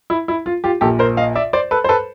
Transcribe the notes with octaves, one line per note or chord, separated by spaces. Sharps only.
E4
E4
F4
F4 G4
A#1 A#2 G4 A4
A#4 C5
D#5 F5
D5 E5
C5 D5
A4 B4
C5
A4 B4